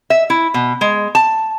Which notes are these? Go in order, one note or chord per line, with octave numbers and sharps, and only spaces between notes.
E5
E4
B2
G#3
A5